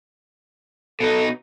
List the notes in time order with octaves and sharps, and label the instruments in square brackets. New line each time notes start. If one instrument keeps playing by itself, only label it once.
[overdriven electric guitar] B2 D#4 [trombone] A4